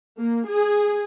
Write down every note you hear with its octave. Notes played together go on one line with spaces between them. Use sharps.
A#3
G#4